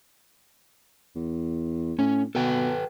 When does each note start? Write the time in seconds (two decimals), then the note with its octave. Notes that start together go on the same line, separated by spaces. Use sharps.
1.15 E2
1.99 A2 C#4
2.35 B2 A4 B4 G5